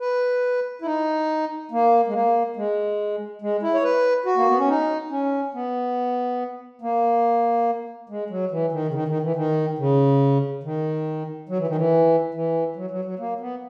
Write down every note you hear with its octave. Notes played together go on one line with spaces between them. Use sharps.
B4
E4
D#4
A#3
G#3
A#3
G#3
G#3
E4
C#5
B4
F#4
A#3
B3
C#4
D#4
C#4
B3
A#3
G#3
F#3
E3
D#3
C#3
D#3
D#3
E3
D#3
C#3
D#3
F#3
E3
D#3
E3
E3
F#3
F#3
F#3
A#3
B3